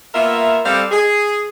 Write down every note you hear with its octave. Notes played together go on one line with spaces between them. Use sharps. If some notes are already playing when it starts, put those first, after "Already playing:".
A#3 B3 F4 A#4 E5
G3 C4 A4 C5 D5 F5
G#4